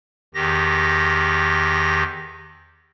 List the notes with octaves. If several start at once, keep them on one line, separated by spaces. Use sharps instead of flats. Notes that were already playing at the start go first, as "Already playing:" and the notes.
E2 D#3 G4 A#6